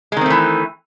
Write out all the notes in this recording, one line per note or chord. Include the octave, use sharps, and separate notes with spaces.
D#3 E3 G#3 A3 C4